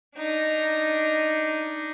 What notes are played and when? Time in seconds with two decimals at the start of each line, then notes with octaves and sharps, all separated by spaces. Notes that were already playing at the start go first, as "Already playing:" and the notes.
0.15 D4 D#4